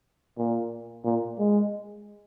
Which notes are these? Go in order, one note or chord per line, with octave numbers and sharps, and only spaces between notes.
A#2
A#2
G#3